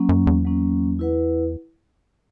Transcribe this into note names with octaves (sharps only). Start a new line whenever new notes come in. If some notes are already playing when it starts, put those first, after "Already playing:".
Already playing: F#3 A#3 C#4
F#2
E2
F#3 A#3 C#4
E4 B4 F#5